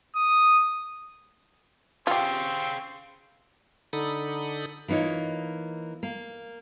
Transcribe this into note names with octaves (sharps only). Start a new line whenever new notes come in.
D#6
C4 F4 G4 G#4 F5 G#5
D3 D#4 A4 B5 D#6
E3 A#3 D#4 F4 C#5
A#3